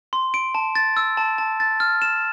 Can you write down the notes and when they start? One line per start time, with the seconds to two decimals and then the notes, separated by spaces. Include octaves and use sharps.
0.13 C6
0.34 D7
0.55 A5
0.75 A6
0.97 E6
1.17 A5
1.38 A5
1.60 A6
1.80 F6
2.02 E7